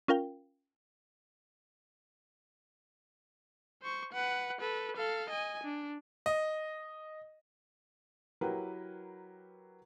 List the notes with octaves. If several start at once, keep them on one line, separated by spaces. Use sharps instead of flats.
C#4 F4 A#4 F5 G5
C5 C#6
B4 F#5
A4 B4
A4 F5
D#5 G#5
D4
D#5
F#3 E4 G4 A#4 B4